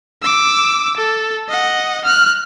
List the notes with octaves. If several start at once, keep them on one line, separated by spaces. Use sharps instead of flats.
D6 E6
A4
D#5 F#5
F6 F#6